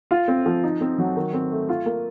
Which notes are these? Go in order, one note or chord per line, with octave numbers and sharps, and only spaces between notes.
F4
C4
F3
D#4
C4
F#3
D#3
C4
A3
F4
A#3